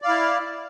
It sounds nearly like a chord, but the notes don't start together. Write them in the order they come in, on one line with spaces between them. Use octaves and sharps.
D5 F5 E4